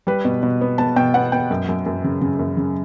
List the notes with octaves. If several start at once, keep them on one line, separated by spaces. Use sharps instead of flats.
G3 B4
B2
B2
B3
B3 A5
B2 G5
B3 F#5
B3 G5
F#2
F#2
F#2
C#3
C#3
F#2
C#3